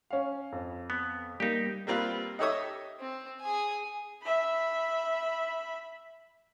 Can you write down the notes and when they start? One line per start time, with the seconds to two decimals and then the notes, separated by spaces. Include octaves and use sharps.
0.11 C#4 F5
0.52 F2
0.90 B3
1.40 G3 A#3 D#4 G4 G6
1.87 G3 A#3 C4 F4 G4 B4
2.39 D#4 G4 A4 C#5 E5 D#6
3.00 C4
3.41 G#4 G#5
4.23 E5 B5